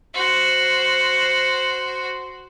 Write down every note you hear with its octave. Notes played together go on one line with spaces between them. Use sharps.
F#4 C5